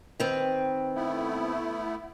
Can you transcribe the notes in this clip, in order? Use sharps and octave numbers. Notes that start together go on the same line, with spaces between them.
D#3 C4 B4
A3 B3 E4